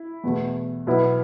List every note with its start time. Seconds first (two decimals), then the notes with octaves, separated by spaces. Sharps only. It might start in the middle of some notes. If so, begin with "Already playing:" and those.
Already playing: E4
0.24 E2 B2 A3
0.87 B1 B2 B3 E4